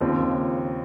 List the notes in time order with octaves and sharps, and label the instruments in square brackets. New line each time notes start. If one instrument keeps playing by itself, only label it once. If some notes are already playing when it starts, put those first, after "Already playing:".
[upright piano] D#2 C#3 F3 C4